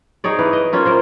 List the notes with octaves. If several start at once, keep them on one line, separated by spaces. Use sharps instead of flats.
D#4 G#4 C#5 D5
E3 B4
D#5
A#3 C#4 F4
A#3 A#4 C5